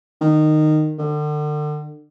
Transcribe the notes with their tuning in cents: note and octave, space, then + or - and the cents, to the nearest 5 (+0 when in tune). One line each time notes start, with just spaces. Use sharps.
D#3 -15
D3 +40